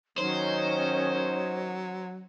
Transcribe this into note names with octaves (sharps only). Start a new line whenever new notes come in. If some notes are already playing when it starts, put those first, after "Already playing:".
D#3 F#3 C#4 C5 C#5 D#5